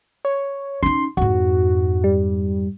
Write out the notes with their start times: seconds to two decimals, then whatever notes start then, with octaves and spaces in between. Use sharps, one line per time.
0.25 C#5
0.83 C#4 D#4 C6
1.17 F2 G#2 F#4
2.04 G3